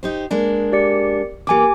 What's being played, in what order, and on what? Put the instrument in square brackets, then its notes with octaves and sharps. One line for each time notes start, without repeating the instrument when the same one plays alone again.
[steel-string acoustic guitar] D#4 G4 C5
G#3 A#3 D4
[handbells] G4 D5 C#7
[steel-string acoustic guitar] E2 E3 A#3 [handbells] G4 G#5 D6